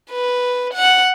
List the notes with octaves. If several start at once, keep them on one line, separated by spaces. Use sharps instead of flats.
B4
F#5